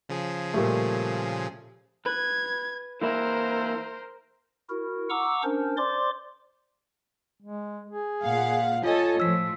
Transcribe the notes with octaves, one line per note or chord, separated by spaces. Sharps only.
C#3 F3 G#4
A#2 G3 A3
B4 G#6
E3 A#3 E4 A#4 C5
E4 F#4 A#4
F#5 A#5 C#6 D6 E6
C#4 D4 A#4 C5
C5 D5 C6 D6
G#3
G#4
A#2 F5 F#5
F4 A4 C#5 D#5 G#5
A2 F3 E6 B6